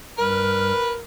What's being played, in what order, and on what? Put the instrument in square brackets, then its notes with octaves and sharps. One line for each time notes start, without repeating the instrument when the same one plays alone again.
[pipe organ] G2 G3 F6 [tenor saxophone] A#4 [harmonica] B4